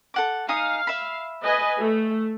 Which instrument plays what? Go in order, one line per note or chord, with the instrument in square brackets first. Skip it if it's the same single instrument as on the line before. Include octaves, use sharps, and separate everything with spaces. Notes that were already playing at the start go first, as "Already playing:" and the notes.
[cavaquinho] A4 F#5 D6
[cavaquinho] D#4 G#5 D#6 [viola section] F5
[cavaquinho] E5 B5
[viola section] B4 D#5 G#5
A3